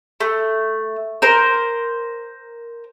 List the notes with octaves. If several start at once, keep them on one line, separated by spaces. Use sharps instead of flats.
A3
A#4 C5